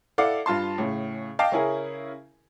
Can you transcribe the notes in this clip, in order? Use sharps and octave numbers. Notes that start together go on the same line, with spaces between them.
E4 A4 D5 F5 F#5 D6
G2 F4 A5 C6
A2 C#3
D#5 F5 G5 A5 D6
C#3 C#4 E4 G#4 A#4